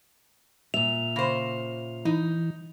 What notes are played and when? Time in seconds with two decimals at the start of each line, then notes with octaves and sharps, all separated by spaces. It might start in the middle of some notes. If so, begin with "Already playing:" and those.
0.74 A#2 E5 F7
1.16 C#3 C5
2.05 E3 D#4